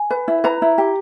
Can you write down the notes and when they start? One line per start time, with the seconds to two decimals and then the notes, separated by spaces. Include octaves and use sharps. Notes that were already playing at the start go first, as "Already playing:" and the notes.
Already playing: G#5
0.10 B4
0.28 E4
0.44 B4 A#5
0.62 E4
0.78 G4